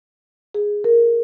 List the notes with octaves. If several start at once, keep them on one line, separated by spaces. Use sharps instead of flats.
G#4
A#4